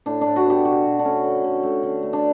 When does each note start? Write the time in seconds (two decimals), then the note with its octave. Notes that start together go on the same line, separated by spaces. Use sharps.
0.06 A2 D4
0.21 A2 D4
0.36 F#4
0.46 B3 G4
0.65 B2 F#4
0.85 B2
0.99 D4
1.04 A3 C#4
1.24 D3
1.44 D3
1.63 A3
1.83 D3
2.03 A3
2.13 D4